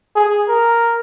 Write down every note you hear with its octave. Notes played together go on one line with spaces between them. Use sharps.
G#4
A#4